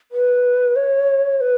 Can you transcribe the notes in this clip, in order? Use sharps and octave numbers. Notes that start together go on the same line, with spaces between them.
B4
C#5
B4